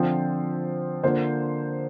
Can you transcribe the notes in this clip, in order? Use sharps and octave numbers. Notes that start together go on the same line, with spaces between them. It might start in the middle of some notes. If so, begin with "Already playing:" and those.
Already playing: D3 F3 C4 F4 C5
D3 A#3 F4 C5